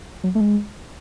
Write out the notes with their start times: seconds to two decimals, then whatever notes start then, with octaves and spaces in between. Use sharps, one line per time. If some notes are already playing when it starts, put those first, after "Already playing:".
0.24 F#3
0.35 A3
0.40 G#3